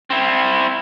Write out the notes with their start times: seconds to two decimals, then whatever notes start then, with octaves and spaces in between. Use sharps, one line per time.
0.10 C4 E4